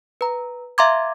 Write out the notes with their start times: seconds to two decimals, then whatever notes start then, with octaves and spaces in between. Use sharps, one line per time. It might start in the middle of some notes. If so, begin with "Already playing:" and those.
0.21 B4 A#5
0.78 E5 F5 A#5 C6 D6 G#6